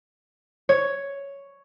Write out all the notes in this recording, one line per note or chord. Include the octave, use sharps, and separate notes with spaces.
C#5